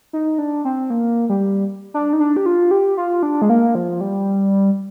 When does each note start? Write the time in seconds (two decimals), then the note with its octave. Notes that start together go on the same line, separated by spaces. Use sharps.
0.13 D#4
0.38 D4
0.65 C4
0.90 A#3
1.29 G3
1.94 D4
2.13 D#4
2.20 D4
2.37 G4
2.46 F4
2.71 G4
2.97 F4
3.23 D4
3.42 G#3
3.50 A#3
3.75 F3
4.01 G3